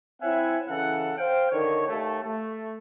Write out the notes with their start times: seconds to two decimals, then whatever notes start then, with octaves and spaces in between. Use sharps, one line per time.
0.22 C4 E4 C#5 E5 F#5 G#5
0.68 C#3 E3 C#4 A4 F#5
1.17 C5 F5 G5
1.50 D3 D#3 A#4 C#5
1.87 D#2 A3
2.23 A3